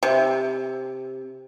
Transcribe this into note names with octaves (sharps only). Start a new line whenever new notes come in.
C3